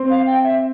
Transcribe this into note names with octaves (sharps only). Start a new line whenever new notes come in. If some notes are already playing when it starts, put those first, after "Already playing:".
Already playing: C4 C5
F5
G5
E5